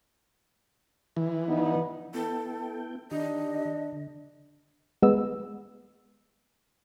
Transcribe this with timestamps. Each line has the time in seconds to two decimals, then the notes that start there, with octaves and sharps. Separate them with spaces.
1.17 E3
1.48 G2 B3 D#4
2.14 B3 E4 A4 G5
3.11 D#3 D4 G4 D#5
3.92 D3
5.02 G#3 B3 E6